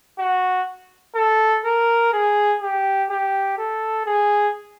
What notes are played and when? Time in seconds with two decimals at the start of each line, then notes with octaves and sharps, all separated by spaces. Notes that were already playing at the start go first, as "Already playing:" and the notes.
0.19 F#4
1.15 A4
1.65 A#4
2.13 G#4
2.61 G4
3.10 G4
3.58 A4
4.06 G#4